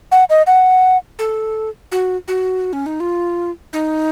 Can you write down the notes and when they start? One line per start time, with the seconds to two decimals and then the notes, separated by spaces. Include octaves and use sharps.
0.12 F#5
0.30 D#5
0.47 F#5
1.19 A4
1.92 F#4
2.28 F#4
2.73 C#4
2.86 D#4
3.00 F4
3.73 D#4